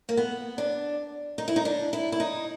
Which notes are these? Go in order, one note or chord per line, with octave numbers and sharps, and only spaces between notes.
A#3
B3
D4
D#4
E4
D#4
D4
E4
E4
D#4